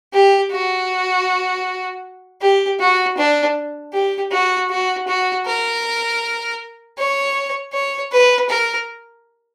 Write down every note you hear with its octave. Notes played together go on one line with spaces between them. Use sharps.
G4
F#4
G4
F#4
D4
G4
F#4
F#4
F#4
A#4
C#5
C#5
B4
A#4